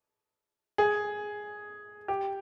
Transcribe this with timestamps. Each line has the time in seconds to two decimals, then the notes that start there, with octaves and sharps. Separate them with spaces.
0.78 G#4
2.08 G4